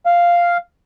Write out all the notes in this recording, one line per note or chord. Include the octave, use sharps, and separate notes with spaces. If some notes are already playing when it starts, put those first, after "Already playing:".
F5